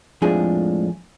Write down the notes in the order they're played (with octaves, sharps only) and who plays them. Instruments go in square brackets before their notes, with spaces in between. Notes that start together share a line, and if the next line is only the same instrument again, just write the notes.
[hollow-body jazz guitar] F2 A2 F3 G#3 D4 G#4